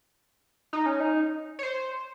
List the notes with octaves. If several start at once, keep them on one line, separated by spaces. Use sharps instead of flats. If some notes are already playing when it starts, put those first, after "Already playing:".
D#4
C#4
D#4
C#5
C5